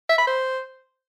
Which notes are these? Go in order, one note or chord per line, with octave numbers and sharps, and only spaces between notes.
E5
B5
C5